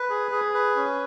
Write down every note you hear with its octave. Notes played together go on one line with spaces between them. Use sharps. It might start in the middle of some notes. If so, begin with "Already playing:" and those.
Already playing: B4
G#4
G#4
B4
C#4